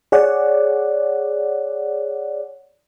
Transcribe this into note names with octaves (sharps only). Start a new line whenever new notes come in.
G#4 C#5 D5 F#5